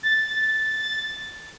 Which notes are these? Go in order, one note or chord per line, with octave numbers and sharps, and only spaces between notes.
A6